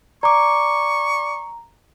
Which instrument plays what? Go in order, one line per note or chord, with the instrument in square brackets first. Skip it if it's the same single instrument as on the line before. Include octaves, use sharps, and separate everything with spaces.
[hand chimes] D5 D6 [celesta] A#5 [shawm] C#6